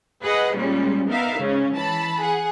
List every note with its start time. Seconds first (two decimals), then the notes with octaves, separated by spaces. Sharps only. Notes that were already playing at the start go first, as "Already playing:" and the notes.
0.22 G#4 B4 D#5 F#5
0.56 A#2 G3 G#3 C#4
1.08 B3 D#4 A#4 E5 F5
1.39 G#2 C#3 C#4
1.73 E3 A5 B5
2.21 G#4 F#5